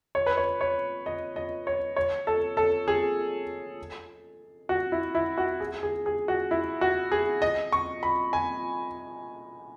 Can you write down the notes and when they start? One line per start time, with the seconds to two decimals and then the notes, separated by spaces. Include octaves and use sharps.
0.15 C#5
0.26 B4
0.37 C#5
0.61 C#5
1.06 D#5
1.36 D#5
1.67 C#5
1.96 C#5
2.27 A4
2.57 A4
2.88 G#4
4.69 F#4
4.92 E4
5.15 E4
5.38 F#4
5.60 G#4
5.83 G#4
6.06 G#4
6.28 F#4
6.51 E4
6.81 F#4
7.12 G#4
7.42 D#5
7.72 C#6
8.03 B5
8.33 G#5